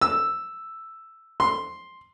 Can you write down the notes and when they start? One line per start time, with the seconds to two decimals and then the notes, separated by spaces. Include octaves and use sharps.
0.01 E6
1.40 C6